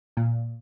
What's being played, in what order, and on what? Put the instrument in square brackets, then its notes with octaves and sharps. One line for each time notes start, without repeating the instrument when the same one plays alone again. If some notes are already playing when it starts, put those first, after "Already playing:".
[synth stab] A#2